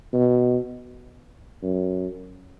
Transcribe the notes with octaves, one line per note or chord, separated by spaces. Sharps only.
B2
F#2